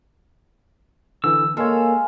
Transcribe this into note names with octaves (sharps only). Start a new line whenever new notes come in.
D3 E3 E6
G#3 A#3 A4 C#5 F5